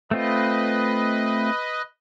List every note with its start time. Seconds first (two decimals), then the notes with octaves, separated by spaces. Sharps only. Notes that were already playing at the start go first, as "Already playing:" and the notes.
0.11 A3 C4 F4 B4 D#5